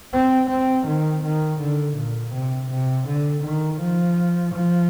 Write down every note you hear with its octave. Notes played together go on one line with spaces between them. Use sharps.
C4
C4
D#3
D#3
D3
A#2
C3
C3
D3
D#3
F3
F3